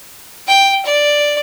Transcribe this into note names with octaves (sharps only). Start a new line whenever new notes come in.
G5
D5